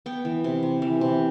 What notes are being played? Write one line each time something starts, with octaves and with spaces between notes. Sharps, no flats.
B3 G5
E3
C3
C3
E3
C3